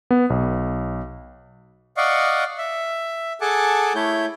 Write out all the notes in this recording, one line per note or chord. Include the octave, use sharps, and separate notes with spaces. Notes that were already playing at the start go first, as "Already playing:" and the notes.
B3
B1
D5 D#5 F5 F#5 C#6
E5
G#4 A4 F#5 G#5 A5 D6
A3 E4 C#5 G6